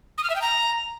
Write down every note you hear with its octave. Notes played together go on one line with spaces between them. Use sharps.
D#6
F6
E5
G5
A#5